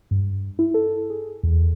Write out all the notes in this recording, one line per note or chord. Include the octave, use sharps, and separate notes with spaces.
G2
E4
A4
G#4
E2